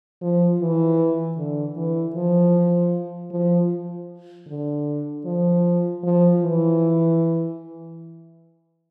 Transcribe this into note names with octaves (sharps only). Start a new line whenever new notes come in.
F3
E3
D3
E3
F3
F3
D3
F3
F3
E3